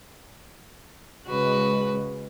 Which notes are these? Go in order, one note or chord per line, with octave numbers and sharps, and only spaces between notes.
C#3 G#3 F#4 B4